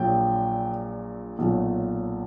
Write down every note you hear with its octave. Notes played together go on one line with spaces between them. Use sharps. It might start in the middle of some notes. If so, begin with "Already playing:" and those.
Already playing: A#1 A#2 F#3 G5
B1 A#2 F#3